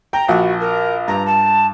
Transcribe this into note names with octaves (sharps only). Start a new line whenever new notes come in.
G5 A#5
A#1 F#4
A#4
G2 A#5
A5